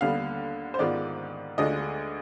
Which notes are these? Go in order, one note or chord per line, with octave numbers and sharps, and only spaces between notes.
D#2 D3 G3 B3 F5
C5
G#2 D#3 G#3 B3 F4 D5
D2 D3 G#3 D4 F4 D#5